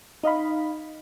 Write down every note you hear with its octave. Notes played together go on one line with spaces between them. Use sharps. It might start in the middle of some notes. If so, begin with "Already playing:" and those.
D#4 D#5 F5 B5